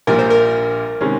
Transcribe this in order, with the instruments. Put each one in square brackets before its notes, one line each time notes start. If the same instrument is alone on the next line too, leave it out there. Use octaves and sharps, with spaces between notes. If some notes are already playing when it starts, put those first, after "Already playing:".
[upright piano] A#1 A#2 G3 [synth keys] A#4
[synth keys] C5
A#4
[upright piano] C3 D#3 G#3 C#4